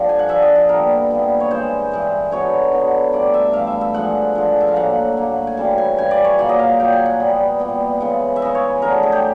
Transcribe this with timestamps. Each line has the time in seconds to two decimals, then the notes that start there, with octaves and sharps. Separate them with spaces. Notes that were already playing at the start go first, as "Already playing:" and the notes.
Already playing: G2 D3 F3
0.09 G#5
0.19 F#5
0.28 G2 D3 F3 E5
0.42 D#5
0.56 A4
0.69 A#2 G3 B3 A#4
1.11 A#2 G3 B3
1.40 C#5
1.50 G2 E3 G#3 C5
1.92 G2 E3 G#3
2.31 D3 F#3 B3 C#5
2.72 D3 F#3 B3
3.13 G2 E3 A3 D5
3.34 E5
3.53 G2 E3 A3 F5
3.67 E5
3.81 E5
3.94 D3 F3 G#3 F#5
4.35 D3 F3 G#3
4.61 E5
4.68 F5
4.76 A2 F#3 A#3 F#5
5.17 A2 F#3 A#3
5.47 G#5
5.57 F#2 C#3 E3 G3 A5
5.78 G#5
5.98 F#2 C#3 E3 G3 G#5
6.11 D5
6.24 C#5
6.39 A#2 F#3 A#3 D5
6.49 D#5
6.59 F5
6.80 A#2 F#3 A#3 G5
6.92 G#5
7.06 F#5
7.19 A#2 G3 B3
7.60 A#2 G3 B3
8.00 C#3 E3 G#3
8.36 E5
8.42 C#3 E3 G#3 D#5
8.55 C#5
8.82 F#2 D3 F#3 A3 A#4
8.92 A4
9.03 G#4
9.12 G4